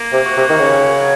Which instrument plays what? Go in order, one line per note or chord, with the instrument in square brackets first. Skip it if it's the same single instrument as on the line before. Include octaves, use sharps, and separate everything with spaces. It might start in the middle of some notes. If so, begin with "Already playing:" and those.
Already playing: [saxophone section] A#3
[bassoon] C3
[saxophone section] F#4
[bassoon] C3
D#3
[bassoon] C#3 [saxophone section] C#4
[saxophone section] F#3